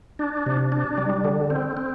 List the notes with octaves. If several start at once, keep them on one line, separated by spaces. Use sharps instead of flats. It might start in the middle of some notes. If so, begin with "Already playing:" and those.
D4
C3
D4
G3
D3
C4
C4